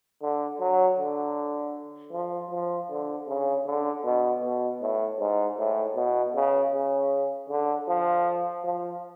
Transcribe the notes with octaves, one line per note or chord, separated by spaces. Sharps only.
D3
F#3
D3
F3
F3
D3
C#3
D3
B2
B2
A2
G#2
A2
B2
C#3
C#3
D3
F3
F3